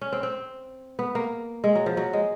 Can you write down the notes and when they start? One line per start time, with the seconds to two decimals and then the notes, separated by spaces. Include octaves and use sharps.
0.01 C#4
0.12 C4
0.23 C4
0.99 B3
1.15 A#3
1.64 G#3
1.75 F#3
1.86 F3
1.97 F#3
2.13 G#3